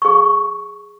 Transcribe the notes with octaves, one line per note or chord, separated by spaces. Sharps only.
G#4 C#6